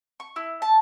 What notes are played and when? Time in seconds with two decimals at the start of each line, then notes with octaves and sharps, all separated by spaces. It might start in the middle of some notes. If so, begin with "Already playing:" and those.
0.20 C#6
0.36 E4
0.62 A5